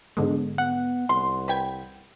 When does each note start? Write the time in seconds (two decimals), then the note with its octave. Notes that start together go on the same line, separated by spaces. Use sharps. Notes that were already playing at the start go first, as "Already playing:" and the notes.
0.17 G#2 D3 G#3 B3
0.58 B3 F#5
1.09 C2 C6
1.48 B4 G5 G#6 B6